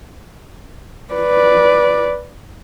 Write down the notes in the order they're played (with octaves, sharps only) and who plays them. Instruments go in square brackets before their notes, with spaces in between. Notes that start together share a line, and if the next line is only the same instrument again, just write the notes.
[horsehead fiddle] B4 D5